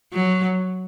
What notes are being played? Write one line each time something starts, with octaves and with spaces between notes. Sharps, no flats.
F#3